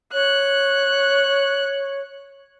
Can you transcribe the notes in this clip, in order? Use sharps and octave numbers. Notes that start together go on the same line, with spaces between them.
C#5 F#6